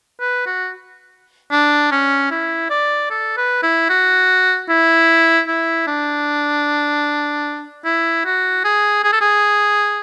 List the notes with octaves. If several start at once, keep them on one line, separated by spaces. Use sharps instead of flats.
B4
F#4
D4
C#4
E4
D5
A4
B4
E4
F#4
E4
E4
D4
E4
F#4
G#4
G#4
A4
G#4